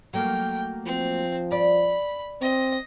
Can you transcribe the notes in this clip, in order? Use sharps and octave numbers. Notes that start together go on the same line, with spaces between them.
F#3 A3 A#3 G5
F3 C4
D5 B5
C4 D#5